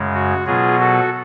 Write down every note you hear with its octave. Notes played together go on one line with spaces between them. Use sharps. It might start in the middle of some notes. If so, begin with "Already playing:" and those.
Already playing: F#2 C#3 G#3
F#4
B2 F#3 B3 F4 G#4
F#4 A4